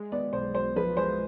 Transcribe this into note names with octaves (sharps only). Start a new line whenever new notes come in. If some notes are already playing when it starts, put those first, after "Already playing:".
Already playing: G#3
B3 D5
B1 C5
B1 C5
F3 B4
G#3 C5